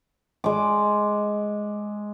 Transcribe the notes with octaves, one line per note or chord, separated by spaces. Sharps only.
G#3 D6